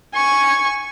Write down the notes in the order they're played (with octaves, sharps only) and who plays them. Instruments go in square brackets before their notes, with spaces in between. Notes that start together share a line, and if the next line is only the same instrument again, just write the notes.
[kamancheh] G#5 C#6